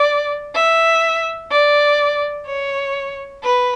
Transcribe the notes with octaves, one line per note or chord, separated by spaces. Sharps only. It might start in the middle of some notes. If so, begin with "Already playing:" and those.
Already playing: D5
E5
D5
C#5
B4